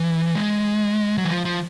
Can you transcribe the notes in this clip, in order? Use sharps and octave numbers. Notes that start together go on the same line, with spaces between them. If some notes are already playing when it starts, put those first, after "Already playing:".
Already playing: E3
G#3
F#3
E3
F3
F3